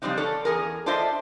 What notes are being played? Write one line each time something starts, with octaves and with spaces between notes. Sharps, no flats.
C#3 F3 G3 C4 D4 D#4
C#4 D4 A4
E2 G#4 A#4
D4 F4 A4 C5 D#5 E5